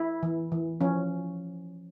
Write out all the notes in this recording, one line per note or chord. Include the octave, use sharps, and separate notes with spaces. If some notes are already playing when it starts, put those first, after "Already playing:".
Already playing: E4
E3
E3
F3 C#4